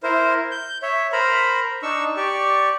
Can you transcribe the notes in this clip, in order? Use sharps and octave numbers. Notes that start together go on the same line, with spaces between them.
E4 A#4 C5
G6
C#5 E5
A#4 C5 A#5 B5
D4 D#4 C#6 E6
G4 D5 C#6